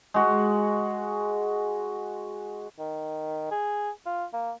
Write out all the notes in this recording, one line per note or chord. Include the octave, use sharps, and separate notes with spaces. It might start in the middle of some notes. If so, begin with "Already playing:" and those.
G#3 F#4
D#3
G#4
F4
A#3